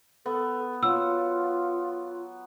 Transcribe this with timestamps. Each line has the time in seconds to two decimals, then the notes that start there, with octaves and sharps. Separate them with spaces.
0.26 B3 A4
0.83 F#3 F4 F#5 E6